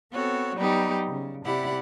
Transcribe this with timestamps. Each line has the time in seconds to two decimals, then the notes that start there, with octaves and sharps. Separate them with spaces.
0.12 B3 C4 F#4 A4 C#5
0.55 F#3 G3 B3 D#4 G4
1.08 C#3
1.45 C3 E4 G4 D5 F#5